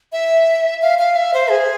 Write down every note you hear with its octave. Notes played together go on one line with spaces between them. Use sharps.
E5
F5
F5
E5
C5
G#4